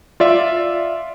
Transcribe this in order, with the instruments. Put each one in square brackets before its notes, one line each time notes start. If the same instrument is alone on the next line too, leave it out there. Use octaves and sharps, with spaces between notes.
[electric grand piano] F4 D5 E5